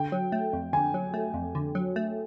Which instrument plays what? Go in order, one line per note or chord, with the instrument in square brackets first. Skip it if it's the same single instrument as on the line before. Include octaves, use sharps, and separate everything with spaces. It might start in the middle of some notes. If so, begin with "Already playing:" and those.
Already playing: [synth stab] D3 [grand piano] G5
[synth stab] F#3
A3
F2
[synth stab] D3 [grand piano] G#5
[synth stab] F#3
A3
F2
D3
F#3
A3